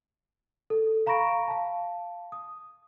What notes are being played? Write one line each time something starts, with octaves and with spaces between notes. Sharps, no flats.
A4
F5 A#5 B5 C#6 A#6 D7
F5 A5
D#6